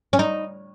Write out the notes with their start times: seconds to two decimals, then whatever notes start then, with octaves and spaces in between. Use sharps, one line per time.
0.13 C#4
0.19 D#4